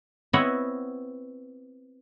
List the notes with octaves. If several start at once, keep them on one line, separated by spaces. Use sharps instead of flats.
B3 C4 E4 C#5 D#5 F#5